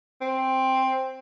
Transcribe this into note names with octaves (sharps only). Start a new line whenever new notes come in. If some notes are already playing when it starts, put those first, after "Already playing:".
C4